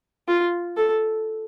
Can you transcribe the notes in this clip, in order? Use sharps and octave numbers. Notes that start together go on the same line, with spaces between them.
F4
A4